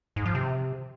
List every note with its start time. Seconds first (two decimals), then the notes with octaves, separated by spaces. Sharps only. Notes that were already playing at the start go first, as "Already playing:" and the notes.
0.16 G#2
0.26 F3
0.35 C3